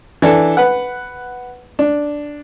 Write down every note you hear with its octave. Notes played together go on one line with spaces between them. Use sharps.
E3 D4 A4
B4 F#5
D4